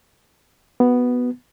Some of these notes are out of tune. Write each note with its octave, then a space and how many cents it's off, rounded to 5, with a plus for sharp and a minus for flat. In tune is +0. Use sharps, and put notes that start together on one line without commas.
B3 +0 F#4 +15